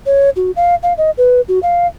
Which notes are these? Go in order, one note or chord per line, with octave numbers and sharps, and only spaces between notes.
C#5
F#4
F5
F5
D#5
B4
F#4
F5